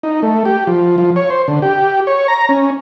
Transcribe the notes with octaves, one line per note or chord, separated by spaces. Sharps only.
D#4
A3
G4
F3
F3
C#5
C5
D3
G4
C#5
A#5
C#4